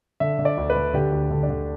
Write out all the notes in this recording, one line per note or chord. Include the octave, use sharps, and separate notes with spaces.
D3 E5
D3
D5
D2
B4
D3
D3 G4
D2
D3
D4
D3